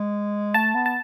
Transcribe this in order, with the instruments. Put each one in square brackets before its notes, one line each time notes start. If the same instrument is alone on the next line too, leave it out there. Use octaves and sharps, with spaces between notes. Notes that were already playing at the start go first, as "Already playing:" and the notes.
Already playing: [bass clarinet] G#3
[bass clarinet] A3 [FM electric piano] A5
[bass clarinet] B3
[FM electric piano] A5